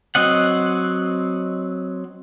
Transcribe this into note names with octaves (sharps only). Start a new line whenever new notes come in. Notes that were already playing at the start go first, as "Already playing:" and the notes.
F#3 C4 D#5 F#5